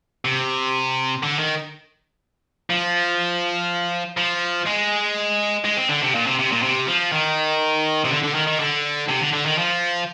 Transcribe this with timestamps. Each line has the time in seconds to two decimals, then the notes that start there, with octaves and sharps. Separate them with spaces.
0.25 C3
1.23 D3
1.39 D#3
2.70 F3
4.17 F3
4.67 G#3
5.65 G#3
5.77 C4
5.89 D3
6.02 C3
6.15 A#2
6.26 C3
6.39 C3
6.52 A#2
6.63 C3
6.88 F3
7.13 D#3
8.04 C3
8.11 D3
8.23 D3
8.35 D#3
8.47 D#3
8.60 D3
9.09 C3
9.21 D3
9.33 D3
9.46 D#3
9.59 F3